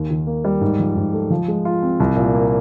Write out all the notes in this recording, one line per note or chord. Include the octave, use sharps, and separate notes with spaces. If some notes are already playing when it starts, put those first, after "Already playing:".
Already playing: D#2
D#3
A#3
G3
G#2
F3
G#2
A3
F3
G#3
F4
C4
C2
A#2
A#3